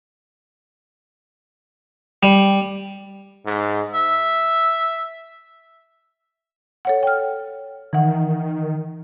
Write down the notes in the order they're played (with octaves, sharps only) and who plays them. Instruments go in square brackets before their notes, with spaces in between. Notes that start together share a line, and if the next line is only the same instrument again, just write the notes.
[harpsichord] G3
[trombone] G#2
[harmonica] E5
[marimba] A4 C#5 F#5
G5 F6
[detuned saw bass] D#3 [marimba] E3 F#5